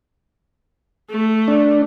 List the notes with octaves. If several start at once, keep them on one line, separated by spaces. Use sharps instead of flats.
A3
D4